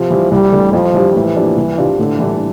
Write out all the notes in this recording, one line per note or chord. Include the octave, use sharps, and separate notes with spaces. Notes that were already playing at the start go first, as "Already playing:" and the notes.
Already playing: C3 F3
E3 G3
C2 G3
C3 E3 A3 D4
F2 F3
E3 G3 D4 G4
A2 E3
F3 A#3 D4 G4
C2
C3 G3 D4 F4
A2 D3
E3 G3 D4